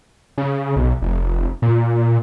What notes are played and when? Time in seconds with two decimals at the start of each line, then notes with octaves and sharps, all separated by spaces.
0.38 C#3
0.76 B1
1.02 F1
1.62 A#2